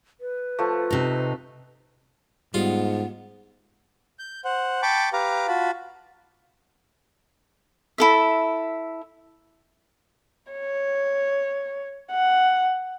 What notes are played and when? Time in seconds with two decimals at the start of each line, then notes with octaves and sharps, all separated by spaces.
0.21 B4
0.59 F3 A3
0.91 C3 D#4
2.54 G#2 G3 B3 F4
4.19 G6
4.44 C5 F#5
4.82 G5 A5 B5 C#6 D6
5.13 G4 B4 F5 A#5 D6
5.48 F4 F#4 A5 B5
7.98 E4 A4 E5
10.51 C#5
12.11 F#5